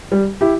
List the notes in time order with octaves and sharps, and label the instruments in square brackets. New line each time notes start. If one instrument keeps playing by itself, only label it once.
[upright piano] G3
E4 G4